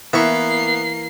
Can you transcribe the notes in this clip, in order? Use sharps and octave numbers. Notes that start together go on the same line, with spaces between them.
E3 A#3 B3 C#6 C7